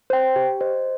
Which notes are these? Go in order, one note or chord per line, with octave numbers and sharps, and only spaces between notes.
C5 G5
G4
C5 D#5